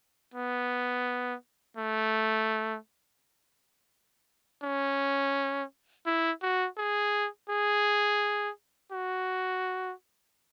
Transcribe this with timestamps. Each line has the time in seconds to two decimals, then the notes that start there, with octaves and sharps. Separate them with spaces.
0.34 B3
1.77 A3
4.63 C#4
6.06 E4
6.42 F#4
6.77 G#4
7.50 G#4
8.92 F#4